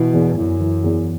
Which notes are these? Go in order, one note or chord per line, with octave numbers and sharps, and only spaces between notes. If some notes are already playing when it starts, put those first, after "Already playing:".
Already playing: B2 E3
E2
F#2 E3
E3
E2